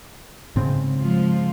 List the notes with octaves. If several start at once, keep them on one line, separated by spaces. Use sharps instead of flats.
G#2 C#3 C4
F3 G#3 F4